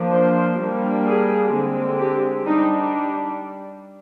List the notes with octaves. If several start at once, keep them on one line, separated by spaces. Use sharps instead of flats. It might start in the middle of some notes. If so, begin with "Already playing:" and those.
Already playing: F3 A#3 D4
C5
G3 A#3 D4
G#4
D3 G#3 C4
G4
G3 D4 D#4